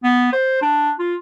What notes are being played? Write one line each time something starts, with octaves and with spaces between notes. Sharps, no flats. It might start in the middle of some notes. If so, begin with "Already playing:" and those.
B3
C5
D4
F4